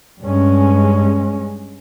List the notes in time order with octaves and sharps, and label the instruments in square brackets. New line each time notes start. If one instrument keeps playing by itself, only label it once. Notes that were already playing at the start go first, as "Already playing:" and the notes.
[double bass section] G2 G#3 C#4